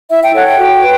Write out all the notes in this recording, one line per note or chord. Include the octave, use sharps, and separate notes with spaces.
E4 E5
G5
A4 C#5 F#5
G5
F#4
B4